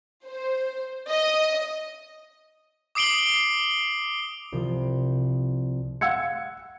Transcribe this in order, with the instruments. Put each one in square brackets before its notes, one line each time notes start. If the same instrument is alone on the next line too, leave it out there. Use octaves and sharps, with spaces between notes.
[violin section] C5
D#5
[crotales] D6 D#6 C7 D7 F#7 G7
[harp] C2 F3
[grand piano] F5 F#5 E6 G#6 C#7